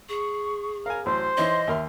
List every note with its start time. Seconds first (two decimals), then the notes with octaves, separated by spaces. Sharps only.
0.09 G#4 C#6
0.86 A#4 F5 G#5
1.06 A1 F#3 C5 C6
1.37 E3 D#4 C#5 D#5
1.68 D#2 A#4 E5 C6